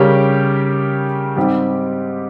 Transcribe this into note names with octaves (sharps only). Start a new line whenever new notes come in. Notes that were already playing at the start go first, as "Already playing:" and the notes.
Already playing: C#3 G3 C#4 G4 A#4
G#2 G3 C4 G4